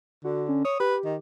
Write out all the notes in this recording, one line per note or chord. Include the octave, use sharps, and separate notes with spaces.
D3 F#4
C#4
C#5 D#6
G4 B4
D#3